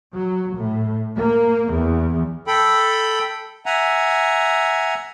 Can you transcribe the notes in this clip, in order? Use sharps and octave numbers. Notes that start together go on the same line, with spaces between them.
F#3
A2
A#3
E2
A4 G5 B5
E5 F#5 G#5 A#5